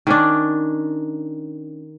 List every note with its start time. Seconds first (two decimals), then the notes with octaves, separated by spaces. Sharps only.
0.07 D#3 C#4 D4